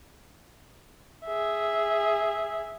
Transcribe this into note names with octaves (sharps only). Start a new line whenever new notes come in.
G#4 E5